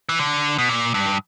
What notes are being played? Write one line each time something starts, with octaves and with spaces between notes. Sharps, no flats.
E3
D3
B2
A#2
G2